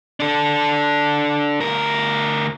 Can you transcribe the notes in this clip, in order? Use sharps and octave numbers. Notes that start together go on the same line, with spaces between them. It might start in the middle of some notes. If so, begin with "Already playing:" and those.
D4 A4
D2 A#4